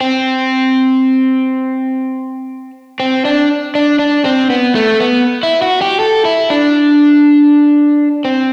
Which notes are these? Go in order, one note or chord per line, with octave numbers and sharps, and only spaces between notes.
C4
C4
D4
D4
D4
C4
B3
A3
B3
E4
F#4
G4
A4
E4
D4
C4